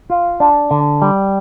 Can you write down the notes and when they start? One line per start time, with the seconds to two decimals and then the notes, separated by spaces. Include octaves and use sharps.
0.10 F4
0.40 D4
0.71 D3
1.02 G3